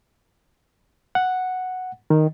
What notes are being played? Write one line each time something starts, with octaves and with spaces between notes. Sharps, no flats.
F#5
D#3